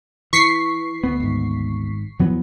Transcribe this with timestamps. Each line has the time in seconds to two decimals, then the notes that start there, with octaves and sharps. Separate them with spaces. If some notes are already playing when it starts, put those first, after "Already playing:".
0.33 E3 C#6 B6 C7
1.03 D2 B3
1.20 G#1 G#2
2.19 E2 F3 F#3 B3